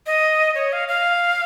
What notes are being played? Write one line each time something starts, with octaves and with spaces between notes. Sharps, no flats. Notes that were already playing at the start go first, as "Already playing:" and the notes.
D#5
C#5
F5
F5